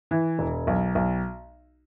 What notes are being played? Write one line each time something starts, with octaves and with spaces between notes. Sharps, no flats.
E3
E1
B1
B1